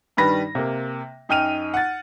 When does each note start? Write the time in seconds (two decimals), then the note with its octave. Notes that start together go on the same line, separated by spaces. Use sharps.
0.17 G2 D#3 G3 B4 A#6
0.55 C3 A#3
1.29 F#2 D#4 G5 F6 D#7 F7
1.74 F#5 A6